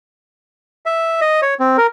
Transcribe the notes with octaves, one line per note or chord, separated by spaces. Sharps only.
E5
D#5
C#5
C4
A#4